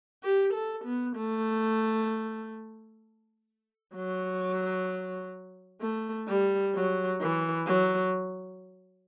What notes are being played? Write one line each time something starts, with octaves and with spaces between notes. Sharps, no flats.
G4
A4
B3
A3
F#3
A3
G3
F#3
E3
F#3